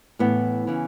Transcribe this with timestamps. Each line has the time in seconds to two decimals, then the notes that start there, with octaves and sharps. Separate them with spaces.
0.19 A2 E3 A3 B3
0.67 C#3 E3